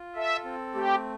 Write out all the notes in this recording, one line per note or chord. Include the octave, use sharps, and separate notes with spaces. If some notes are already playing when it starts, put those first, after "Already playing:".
Already playing: F4
A4 E5
C4
A3 G4